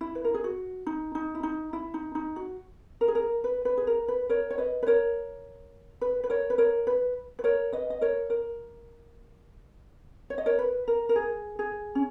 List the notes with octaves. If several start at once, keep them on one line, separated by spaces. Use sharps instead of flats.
E4
B4
A#4
G#4
F#4
D#4
D#4
E4
D#4
E4
D#4
D#4
F#4
A#4
G#4
A#4
B4
B4
G#4
A#4
B4
A#4 C#5
C#5
B4 D#5
B4
A#4 C#5
B4
B4
A#4 C#5
B4
A#4 C#5
B4
B4
A#4 C#5
B4 D#5
D#5
A#4 C#5
A#4
C#5
D#5
A#4 C#5
B4
A#4
A#4
G#4
G#4
C#4